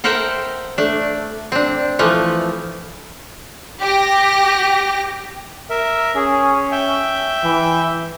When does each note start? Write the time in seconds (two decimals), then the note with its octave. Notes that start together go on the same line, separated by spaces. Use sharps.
0.04 A4 A#4 C5 E5 F#5 G5
0.78 A3 D4
1.52 C4 D4
1.99 E3 F3 A3
3.80 G4 A#6
5.70 A#4 E5
6.16 C#4 G#4
6.72 E5 G5
7.43 E3